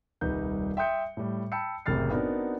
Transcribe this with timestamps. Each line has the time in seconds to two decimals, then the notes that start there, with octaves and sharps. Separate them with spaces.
0.21 D#1 C2 G3 D#4 B4 G6
0.77 E5 G5 C6 D#6 G6 C#7
1.17 A2 G3
1.52 G5 A5 B5 E6 G6 C#7
1.86 F#1 A2 C3 F6 A6 C7
2.10 B3 C4 D4 D#4 F#4 A#4